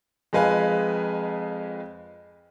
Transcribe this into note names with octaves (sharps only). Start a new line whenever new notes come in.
F2 G#3 B4 F5 G#5